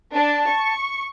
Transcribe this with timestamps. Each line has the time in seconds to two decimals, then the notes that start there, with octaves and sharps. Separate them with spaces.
0.14 D4 A5
0.48 C#6